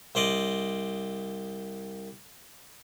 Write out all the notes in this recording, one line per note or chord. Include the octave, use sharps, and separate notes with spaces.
C2 C5 D5 D#5